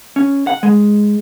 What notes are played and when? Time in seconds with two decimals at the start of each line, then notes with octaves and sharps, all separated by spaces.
0.16 C#4
0.47 F#5
0.63 G#3